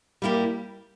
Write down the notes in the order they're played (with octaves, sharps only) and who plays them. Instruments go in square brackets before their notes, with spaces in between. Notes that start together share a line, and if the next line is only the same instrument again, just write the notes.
[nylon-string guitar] G3 A#3 E4 G4